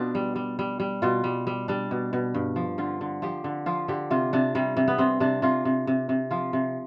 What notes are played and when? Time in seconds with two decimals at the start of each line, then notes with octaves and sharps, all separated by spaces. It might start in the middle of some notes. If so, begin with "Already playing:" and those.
Already playing: B2 B3 D4 F4
0.15 G3
0.36 G3
0.59 G3
0.80 G3
1.02 B2 F4
1.24 G3
1.47 G3
1.68 G3 D4
1.91 B2
2.13 B2
2.35 G2
2.56 F3
2.78 D3 F4
3.01 D3
3.22 F3 G4
3.44 D3
3.66 F3 F4
3.88 D3 G4
4.11 C3 F4
4.33 C3 D4
4.55 C3 G3
4.77 C3
4.88 B3
4.98 C3 C4
5.20 C3 D4
5.42 C3 F4
5.65 C3
5.87 C3
6.09 C3
6.31 F3 F4
6.53 C3